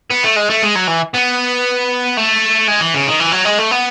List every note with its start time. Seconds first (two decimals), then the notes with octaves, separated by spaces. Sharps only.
0.11 B3
0.24 A3
0.36 G#3
0.50 A3
0.62 G#3
0.75 F#3
0.87 E3
1.14 B3
2.17 A3
2.68 G#3
2.81 E3
2.94 C#3
3.07 D#3
3.20 E3
3.32 F#3
3.45 G#3
3.59 A3
3.71 B3